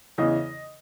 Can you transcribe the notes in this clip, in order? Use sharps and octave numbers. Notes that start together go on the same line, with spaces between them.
E2 C#3 E3 D#5